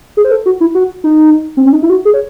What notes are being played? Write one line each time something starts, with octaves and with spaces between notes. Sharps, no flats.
G#4
C5
A4
F#4
E4
F#4
D#4
C4
C#4
D#4
E4
F#4
G#4
C#5